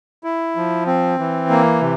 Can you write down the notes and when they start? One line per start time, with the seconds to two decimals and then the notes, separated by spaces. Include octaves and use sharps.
0.24 E4
0.56 F3
0.87 C4
1.19 E3
1.50 A#3
1.81 C3